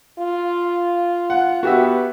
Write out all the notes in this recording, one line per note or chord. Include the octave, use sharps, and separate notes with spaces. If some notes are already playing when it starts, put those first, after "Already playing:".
F4
F#5
B3 F#4 G4 E5